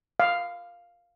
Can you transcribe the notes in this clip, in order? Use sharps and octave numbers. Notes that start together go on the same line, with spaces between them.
F5